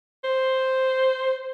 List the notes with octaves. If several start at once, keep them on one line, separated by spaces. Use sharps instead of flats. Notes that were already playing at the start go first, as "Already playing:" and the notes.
C5